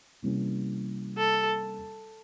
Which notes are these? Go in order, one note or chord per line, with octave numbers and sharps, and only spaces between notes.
C3 E3 G3 A#3 C#4
A4